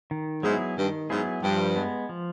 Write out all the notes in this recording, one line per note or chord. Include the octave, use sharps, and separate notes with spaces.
D#3
G#2 F#3 B3 E4 G#4
G2 D#3
G#2 F#3 B3 E4 G#4
G2 F3
G#3 B3
F3